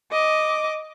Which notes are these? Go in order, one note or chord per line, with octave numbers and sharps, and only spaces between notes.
D#5 D6